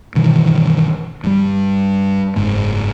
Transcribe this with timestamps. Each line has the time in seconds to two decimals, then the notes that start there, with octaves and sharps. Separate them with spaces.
0.15 G2 B2 D#3 E3
1.24 G2 G3
2.36 F#1 G#2 G#3